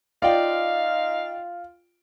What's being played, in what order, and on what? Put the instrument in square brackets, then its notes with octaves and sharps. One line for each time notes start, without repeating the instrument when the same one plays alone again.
[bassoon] D#4 [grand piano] F4 [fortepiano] D5 G5 [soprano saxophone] F5